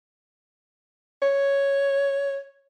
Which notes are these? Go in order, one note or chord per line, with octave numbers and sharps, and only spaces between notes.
C#5